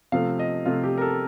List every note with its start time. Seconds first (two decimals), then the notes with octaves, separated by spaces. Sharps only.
0.12 C3 F3 A3 F5
0.39 D#5
0.66 C3 F3 A3 F4
0.84 G4
0.98 A#4
1.02 A4